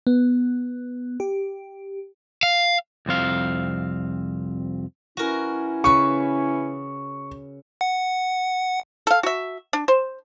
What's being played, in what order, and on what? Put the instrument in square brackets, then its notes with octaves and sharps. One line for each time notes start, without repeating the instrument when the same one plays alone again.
[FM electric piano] B3
G4
[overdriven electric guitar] F5
[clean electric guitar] C2 F2 C4 F5
[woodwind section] E3 C#4 E4 [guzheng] F#4 A#4
[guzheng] C#3 B4 [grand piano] C#6
[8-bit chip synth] F#5
[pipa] A4 F5
F#4 E5
D4
C5